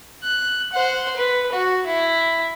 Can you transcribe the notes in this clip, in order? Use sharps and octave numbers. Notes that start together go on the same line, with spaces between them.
F#6
C5 F#5
B4
F#4
E4